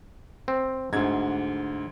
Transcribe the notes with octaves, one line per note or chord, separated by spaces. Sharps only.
C4
D2 G#2 D3 G#6